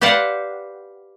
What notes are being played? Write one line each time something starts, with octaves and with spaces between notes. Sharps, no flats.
G4 B4 C5 D5 F5 F#5